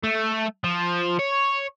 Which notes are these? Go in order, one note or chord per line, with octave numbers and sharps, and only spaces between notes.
A3
F3
C#5